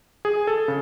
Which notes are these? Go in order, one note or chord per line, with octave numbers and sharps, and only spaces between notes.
G#4
A4
C#3